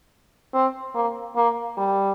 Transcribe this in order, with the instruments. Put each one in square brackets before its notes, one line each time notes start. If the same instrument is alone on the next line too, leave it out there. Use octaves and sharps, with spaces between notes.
[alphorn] C4
A#3
A#3
G3